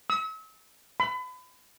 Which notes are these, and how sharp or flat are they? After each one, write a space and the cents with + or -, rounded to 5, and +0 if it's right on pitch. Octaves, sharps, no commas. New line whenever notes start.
E6 -40
B5 +30